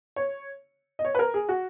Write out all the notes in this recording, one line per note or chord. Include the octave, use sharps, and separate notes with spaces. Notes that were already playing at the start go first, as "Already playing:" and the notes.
C#5
D#5
C#5
B4
A#4
G#4
F#4